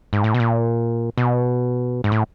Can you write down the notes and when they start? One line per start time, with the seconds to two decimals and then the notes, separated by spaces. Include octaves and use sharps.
0.13 G#2
0.24 A2
0.34 B2
0.40 A#2
1.18 B2
2.04 G#2
2.12 A2